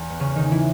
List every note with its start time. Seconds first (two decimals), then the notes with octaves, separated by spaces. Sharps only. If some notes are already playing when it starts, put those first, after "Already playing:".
Already playing: E2
0.10 B3
0.20 C#3 C#4
0.35 D#3 D#4
0.51 E3 E4